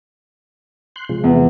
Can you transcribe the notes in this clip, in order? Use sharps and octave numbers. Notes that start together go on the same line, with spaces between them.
C6 F#6 G6
C3 F3 G#3
E2